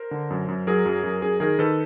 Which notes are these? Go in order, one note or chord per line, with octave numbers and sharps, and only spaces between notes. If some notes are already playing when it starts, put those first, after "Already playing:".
Already playing: A#4 C5
D3
F#2
F#2
F#3 G#4 A#4
F#2
F#2
F#2 G#4 A#4
D#3 G#4 A#4
D#3 A4 B4